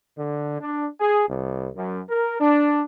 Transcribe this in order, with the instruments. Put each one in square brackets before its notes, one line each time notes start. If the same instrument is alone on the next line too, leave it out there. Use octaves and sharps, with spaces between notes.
[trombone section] D3
D4
G#4
C2
F#2
A#4
D4